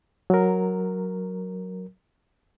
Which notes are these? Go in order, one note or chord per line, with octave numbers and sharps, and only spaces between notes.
F#3 A#4